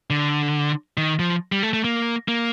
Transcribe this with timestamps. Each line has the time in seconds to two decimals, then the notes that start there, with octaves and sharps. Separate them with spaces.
0.10 D3
0.97 D#3
1.19 F3
1.52 G3
1.63 A3
1.73 A3
1.84 A#3
2.28 A#3